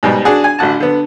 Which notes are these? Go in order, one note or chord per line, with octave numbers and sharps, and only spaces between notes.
G#2 B2 G3
D4 F#4 G#4
G#5
A1 D3 F#4 A5
D3 B3